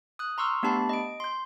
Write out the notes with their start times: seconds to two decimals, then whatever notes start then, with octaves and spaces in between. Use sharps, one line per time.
0.19 D#6 F#6
0.38 A#5 C6 C#6 E6 F6
0.63 A3 B3 D4 G4 A5 B5
0.89 D#5 D7
1.20 C6 G6